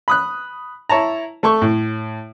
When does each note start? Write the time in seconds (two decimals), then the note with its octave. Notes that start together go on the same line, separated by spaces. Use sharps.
0.08 B5 D#6 F#6
0.89 E4 C#5 A5 A#5
1.43 A3 A4 C#6
1.62 A2